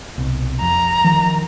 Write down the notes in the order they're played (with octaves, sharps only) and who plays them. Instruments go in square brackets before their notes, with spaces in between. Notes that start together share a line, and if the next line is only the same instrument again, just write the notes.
[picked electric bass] C2 B2
[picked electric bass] F2 [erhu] A#5
[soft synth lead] D#3 [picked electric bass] F3